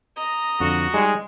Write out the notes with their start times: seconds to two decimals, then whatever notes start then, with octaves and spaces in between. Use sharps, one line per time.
0.16 D#5 A#5
0.60 F2 D3 F#4 F5
0.94 G3 G#3 D#4 G#4